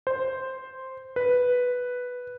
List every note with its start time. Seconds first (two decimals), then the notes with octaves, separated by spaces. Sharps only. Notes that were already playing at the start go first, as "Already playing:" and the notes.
0.07 C5
1.16 B4